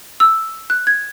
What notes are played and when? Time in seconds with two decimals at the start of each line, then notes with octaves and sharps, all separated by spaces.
0.20 E6
0.70 F#6
0.87 G#6